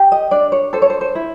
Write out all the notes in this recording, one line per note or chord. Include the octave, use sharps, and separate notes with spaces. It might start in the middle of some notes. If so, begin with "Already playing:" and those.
Already playing: G4
D#5
D4 D5
C#5
A4 C5
C#5
C5
C5
E4